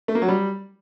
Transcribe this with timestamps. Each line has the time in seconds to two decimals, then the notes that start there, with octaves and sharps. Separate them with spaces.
0.08 A3
0.15 A#3
0.22 F#3
0.28 G3